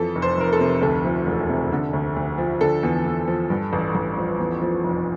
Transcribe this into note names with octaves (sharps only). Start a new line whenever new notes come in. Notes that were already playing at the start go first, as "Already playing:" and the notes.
Already playing: F2 E3 A4
F1
C5
F1 A#4
A4
C3
D2 A4
F3
E1
C3
D3
D2
D2
F3
D3 A4
E2
E2
F3
G2
A1
A1
F3
E2
F3
F1